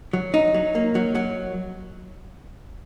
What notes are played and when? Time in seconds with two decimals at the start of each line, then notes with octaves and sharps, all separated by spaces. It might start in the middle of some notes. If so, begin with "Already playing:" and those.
0.13 F#3
0.34 D#4
0.54 F#3
0.75 A#3
0.95 F#3
1.15 F#3